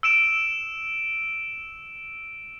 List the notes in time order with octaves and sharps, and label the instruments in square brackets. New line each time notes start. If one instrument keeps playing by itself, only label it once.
[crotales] E6 D7 E7